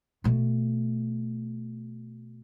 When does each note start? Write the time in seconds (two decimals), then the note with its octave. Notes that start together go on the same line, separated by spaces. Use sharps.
0.24 B2 A3